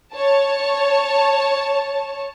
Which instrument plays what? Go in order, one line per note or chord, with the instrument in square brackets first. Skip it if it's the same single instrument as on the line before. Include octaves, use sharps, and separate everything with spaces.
[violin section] C#5 A5